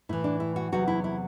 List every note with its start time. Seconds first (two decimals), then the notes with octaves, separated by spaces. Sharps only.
0.09 A2 E3 E4
0.24 D4
0.40 E4
0.56 F#4
0.72 E2 C3 F#3 F#4
0.88 E4
1.04 E4